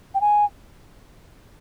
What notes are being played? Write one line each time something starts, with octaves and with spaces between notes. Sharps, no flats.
G5
G#5